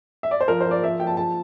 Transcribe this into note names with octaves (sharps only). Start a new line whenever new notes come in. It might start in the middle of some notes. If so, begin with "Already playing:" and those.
E5
D5
C5
F3 A#4
C5
F3
D5
F3 E5
F3 G5
A5
F3 A5